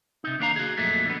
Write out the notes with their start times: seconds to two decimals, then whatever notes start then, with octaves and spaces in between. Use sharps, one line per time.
0.24 C3 D#4
0.39 D#2 A#3 D4 C#5 F5 A#5
0.56 F#4 G#4
0.77 F2 A#2 F#3 G#3 A3
1.06 D3 B3